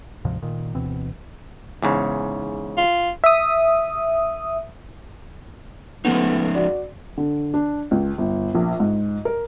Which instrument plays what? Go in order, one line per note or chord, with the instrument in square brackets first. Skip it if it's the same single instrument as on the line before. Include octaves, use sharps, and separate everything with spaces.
[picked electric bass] D2 G#2 C3 F3
A#2 D#3
D2 B2 E3 C4
[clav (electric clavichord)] E2 G#2 C#3
[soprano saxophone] F4
[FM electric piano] E5 D#6
[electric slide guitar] F3 C#4 D#4 [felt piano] A3 B3
[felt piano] F#4 D5
D3
D4
C#2
G1
A#1
G#2
A#4